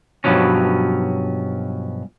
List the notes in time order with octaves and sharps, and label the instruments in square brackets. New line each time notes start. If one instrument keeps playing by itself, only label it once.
[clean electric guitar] G2 B2 F3 F#3 C#4